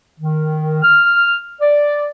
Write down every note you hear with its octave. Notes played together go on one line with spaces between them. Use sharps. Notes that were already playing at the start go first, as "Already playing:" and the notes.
D#3
F6
D5